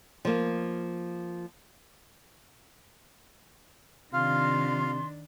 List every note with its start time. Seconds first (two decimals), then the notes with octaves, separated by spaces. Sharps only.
0.25 F3 A#3
4.13 C3 D#3 D4 F4 F5 C6